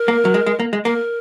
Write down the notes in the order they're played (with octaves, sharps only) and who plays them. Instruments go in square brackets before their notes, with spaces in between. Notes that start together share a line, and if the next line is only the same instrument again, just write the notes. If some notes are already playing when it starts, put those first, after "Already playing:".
Already playing: [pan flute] A#4
[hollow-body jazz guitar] A#3
F#3
G#3
G#3
A#3
G#3
[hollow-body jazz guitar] A#3 [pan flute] A#4